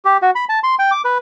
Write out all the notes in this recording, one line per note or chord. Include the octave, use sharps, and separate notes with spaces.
G4
F#4
B5
A5
C6
G5
D6
B4